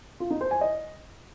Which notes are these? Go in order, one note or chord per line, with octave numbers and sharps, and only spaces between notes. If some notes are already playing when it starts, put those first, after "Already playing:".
F4
D#4
C5
G#5
D#5